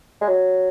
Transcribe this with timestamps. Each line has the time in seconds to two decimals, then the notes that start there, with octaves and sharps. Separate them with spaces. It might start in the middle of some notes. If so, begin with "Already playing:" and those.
0.21 G#3
0.28 F#3